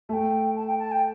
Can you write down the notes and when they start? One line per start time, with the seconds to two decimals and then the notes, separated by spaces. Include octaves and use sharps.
0.09 A3 A5
0.13 G5
0.55 A5
0.67 G5
0.78 A5
0.91 G5